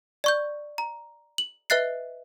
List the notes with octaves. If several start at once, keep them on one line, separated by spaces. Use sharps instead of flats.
D5 C#6 G6
A#5
F#7
B4 D#5 E5 F#6 A6 C7